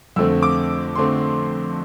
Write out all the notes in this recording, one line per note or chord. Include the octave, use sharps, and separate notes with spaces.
F2 D3 A3 C4 E6
D6
D3 A3 C4 C6